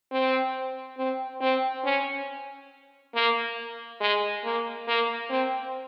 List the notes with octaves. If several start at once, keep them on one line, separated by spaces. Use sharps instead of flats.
C4
C4
C4
C#4
A#3
G#3
A#3
A#3
C4